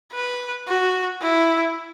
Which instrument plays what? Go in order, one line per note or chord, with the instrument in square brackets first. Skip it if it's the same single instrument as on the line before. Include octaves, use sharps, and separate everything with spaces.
[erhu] B4
F#4
E4